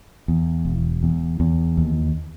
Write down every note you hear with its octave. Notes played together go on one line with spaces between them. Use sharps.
E2
E1
E2
E2
D#2